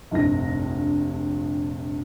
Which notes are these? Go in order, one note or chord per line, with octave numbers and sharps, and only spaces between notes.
F1 A#1 G2 A#6